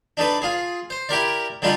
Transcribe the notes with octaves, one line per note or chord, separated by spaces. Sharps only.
D4 D#4 A4 B4
F4 G#4
C5
E4 G4 A#4 D5
D3 G3 D4 D#4 F4 A4